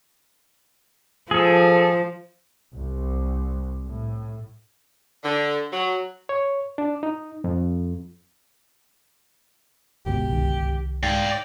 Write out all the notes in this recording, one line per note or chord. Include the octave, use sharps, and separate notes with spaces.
F3 G#4 A4
C2
A2
D3
F#3
C#5
D4
D#4
F2
G1 C#2 B2 G4
C2 D#3
G#2 D5 F5 G5